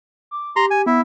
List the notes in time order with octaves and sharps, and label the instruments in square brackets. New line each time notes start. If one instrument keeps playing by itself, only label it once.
[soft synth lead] D6
[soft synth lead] G4 [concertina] A#5 C6
[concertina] G#5
[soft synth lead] B3 [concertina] E4